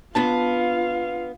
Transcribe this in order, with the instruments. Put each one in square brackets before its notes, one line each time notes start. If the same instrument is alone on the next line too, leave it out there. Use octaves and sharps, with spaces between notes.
[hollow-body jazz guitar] B3 D4 A5 [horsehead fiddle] F4 F5